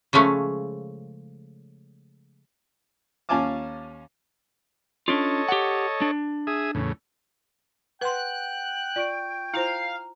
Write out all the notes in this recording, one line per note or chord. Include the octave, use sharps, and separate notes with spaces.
C#3 F3 G#3 A3 C#4
D#2 C#4 F5 G#5 A5 D6
C#4 D4 F4 A4 C#5 D#5
G4 F#5
D4
G#4 E5 D#6
E2 A2 C#3
B4 F#5 G5 C6 F#6
F4 D5 C#6 D7
E4 F4 C5 F5 A#5